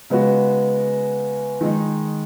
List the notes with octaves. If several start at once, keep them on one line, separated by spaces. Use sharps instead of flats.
C#3 G#3 B3 F#4
D#3 G#3 D#4